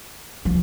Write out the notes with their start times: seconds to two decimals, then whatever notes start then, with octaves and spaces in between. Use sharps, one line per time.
0.45 F3